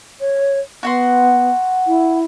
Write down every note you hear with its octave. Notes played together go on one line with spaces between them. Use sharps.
C#5
B3 F#4 F#5 C6
E4